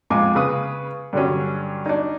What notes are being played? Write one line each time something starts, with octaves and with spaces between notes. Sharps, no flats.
F2 G#2 F4 G#5 D6
C#3 B4 D#6
G2 D3 F#3 C#4
D4 D#4